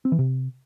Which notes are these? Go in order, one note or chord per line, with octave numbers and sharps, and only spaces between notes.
C4
E3
C3